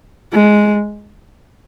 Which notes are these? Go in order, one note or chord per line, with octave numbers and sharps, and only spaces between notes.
G#3